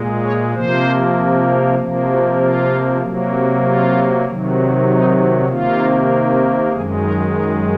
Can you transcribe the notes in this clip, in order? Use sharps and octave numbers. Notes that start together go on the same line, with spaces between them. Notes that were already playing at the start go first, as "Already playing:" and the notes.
Already playing: A#2 G#3
C#5
C3 F3 A#3 C5
C3 F3 A#3
F#4
F4
C3 F#3 A#3
F4
C3 D#3 F#3
D#4
C3 D#3 A#3 F4
F#2 D#3 G#3 G#4
A#4
A#4